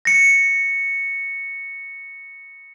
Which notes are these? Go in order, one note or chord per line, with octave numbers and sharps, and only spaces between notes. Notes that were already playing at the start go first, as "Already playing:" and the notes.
A#6 C#7